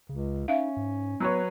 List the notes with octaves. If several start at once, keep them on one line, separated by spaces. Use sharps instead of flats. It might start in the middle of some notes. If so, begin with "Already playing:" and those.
C#2 C#3
C#4 D#4 E5 F5
G#2
F#3 B3 B4 C#5